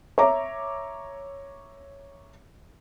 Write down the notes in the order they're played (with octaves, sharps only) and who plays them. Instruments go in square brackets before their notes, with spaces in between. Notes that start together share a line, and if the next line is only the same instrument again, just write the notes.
[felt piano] C#5 E5 A#5 D6